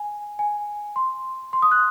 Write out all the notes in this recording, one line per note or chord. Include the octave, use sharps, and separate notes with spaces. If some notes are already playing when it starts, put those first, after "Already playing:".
Already playing: G#5
G#5
C6
C6
D#6
F#6